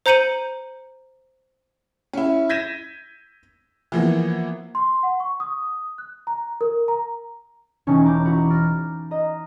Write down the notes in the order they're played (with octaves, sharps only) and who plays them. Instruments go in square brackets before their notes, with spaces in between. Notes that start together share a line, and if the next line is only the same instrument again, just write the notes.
[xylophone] C5 A#5 G6 C#7 D#7 F#7
[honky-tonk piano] C#4 E4
G6 G#6 A#6 B6 D#7 E7
E3 F3 A#3 B3
[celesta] C6
F#5
C#6
D#6
F#6
A#5
A#4
A#5
[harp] E1 E3 C#4 D#4 A5 C#6
A#5 D6 G6
E4 F#4 A#5
F6 A6 A#6 D7
D#5 A#5